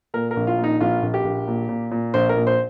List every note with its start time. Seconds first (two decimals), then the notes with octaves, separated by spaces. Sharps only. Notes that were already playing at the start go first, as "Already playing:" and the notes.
0.14 A#2 A#4
0.31 A#4
0.36 A#1
0.47 F4
0.58 A#2
0.64 D#4
0.81 A#1 F4
1.02 A#1
1.14 G4
1.24 A#1
1.48 A#2
1.69 A#2
1.91 A#2
2.14 A#1 C5
2.29 A#4
2.36 A#2
2.47 C5